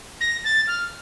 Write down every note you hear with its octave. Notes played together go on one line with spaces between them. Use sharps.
A#6
A6
F6